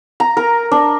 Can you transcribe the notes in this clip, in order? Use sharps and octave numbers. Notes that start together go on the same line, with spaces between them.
A#5
A#4
D4